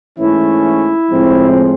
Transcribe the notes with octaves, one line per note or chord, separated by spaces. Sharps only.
G#2 E3 A3 C#4 E4
A2 F3 G#3 C4